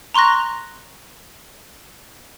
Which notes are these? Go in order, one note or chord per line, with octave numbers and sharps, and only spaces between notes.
A#5 C6 C#6 F#6 A#6